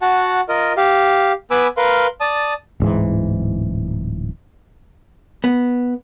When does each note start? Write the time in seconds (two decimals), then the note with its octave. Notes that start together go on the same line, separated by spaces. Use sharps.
0.02 F#4 F#5 A5
0.49 F4 A#4 D#5
0.77 G4 F5
1.51 B3 B4 G#5 B5 D6 E6
1.77 A#4 B4 F5 C6
2.21 D5 A5 D#6
2.80 D1 G#2 E3
5.44 B3